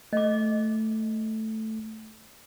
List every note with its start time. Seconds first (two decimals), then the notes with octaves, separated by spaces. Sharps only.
0.13 A3 D#5 D6